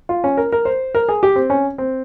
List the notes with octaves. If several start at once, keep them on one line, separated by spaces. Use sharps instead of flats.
F4
C#4
A#4
A#4
C5
A#4
G#4
G4
C4
C#4
C4